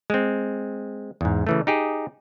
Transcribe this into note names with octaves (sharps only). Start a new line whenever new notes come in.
G#3 C4
E2 G#2
C#3 E3 A3
D#4 G4 G#4